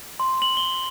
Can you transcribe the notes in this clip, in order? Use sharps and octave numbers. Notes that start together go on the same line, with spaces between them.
C6
F#7
G7